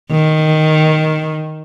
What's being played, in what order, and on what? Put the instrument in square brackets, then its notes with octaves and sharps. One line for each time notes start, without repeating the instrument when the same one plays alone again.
[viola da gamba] D#3